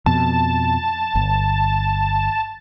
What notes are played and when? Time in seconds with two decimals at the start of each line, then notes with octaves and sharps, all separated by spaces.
0.06 F2 B2 A5
1.15 G1